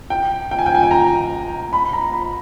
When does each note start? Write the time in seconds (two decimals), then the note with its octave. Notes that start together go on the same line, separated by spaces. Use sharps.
0.10 G5
0.51 G5
0.59 G#5
0.66 G5
0.75 G#5
0.83 G5
0.91 A#5
1.73 B5
1.93 A#5
2.13 B5